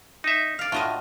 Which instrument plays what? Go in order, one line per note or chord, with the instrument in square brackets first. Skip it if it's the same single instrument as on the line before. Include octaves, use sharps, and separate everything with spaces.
[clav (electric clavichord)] D#4 E5
[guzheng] D5 F5
[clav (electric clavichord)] A2 [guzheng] F4 F#4 D#5